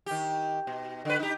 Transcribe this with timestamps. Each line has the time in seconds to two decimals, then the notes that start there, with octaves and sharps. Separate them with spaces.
0.06 D#3 G4
0.67 B2
1.05 D3 B4
1.19 D#4 G4